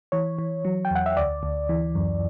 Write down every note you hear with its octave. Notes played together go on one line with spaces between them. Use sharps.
E3 C#5
E3
F#3
G5
E2 F#5
E5
D2 D5
D2
E3
F#2